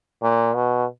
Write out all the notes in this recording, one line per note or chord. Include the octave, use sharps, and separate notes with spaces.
A#2
B2